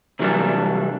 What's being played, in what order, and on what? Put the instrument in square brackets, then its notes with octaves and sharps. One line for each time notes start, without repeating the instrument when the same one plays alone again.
[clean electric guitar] C3 E3 F#3 G3 D4